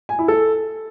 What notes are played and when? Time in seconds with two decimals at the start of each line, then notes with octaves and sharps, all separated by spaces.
0.09 G#5
0.19 E4
0.28 A4